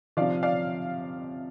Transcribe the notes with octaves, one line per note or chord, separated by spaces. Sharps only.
C3 F3 D5 F5
D5 F5